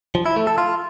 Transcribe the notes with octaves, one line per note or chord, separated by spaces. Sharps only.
F3
E4
A3
A4
F4